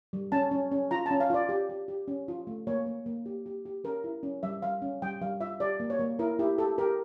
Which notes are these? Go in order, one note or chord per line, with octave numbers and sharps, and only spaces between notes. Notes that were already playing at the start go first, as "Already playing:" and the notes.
G3
C#4 A5
C#4
C#4
F4 A#5
A5
C#4
F5
F4 D5
G4
G4
G4
C#4
F4
A3
A#3 C#5
A#3
A#3
G4
G4
G4
C#4 A#4
E4
C#4
G3 E5
G3 F5
C#4
G3 G5
G3 F5
F4 E5
G4 D5
A#3
C#5
A#3
E4 A#4
E4 G4
G4 A4
G4 A#4